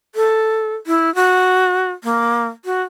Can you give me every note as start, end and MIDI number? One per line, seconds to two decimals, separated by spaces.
0.15 0.74 69
0.87 1.13 64
1.15 1.91 66
2.04 2.45 58
2.65 2.82 66